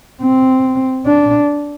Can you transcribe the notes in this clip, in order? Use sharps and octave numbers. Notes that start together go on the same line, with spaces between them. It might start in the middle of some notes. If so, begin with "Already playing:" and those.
C4
D4